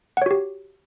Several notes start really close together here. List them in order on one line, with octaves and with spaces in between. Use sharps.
F#5 C#5 F#4 G4